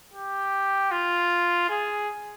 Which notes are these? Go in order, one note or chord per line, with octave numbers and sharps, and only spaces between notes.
G4
F4
G#4